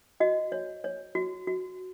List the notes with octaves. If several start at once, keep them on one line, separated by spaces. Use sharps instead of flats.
F#4 D#5
C#5
C#5
F#4
F#4